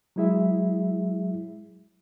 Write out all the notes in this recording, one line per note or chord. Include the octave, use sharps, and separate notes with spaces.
F#3 G#3 E4 G#4 E5